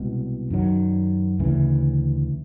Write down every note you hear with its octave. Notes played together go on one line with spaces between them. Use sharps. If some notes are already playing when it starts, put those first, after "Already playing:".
Already playing: C2 B2 G#3
F#2 D#3 F#3
D2 C#3 E3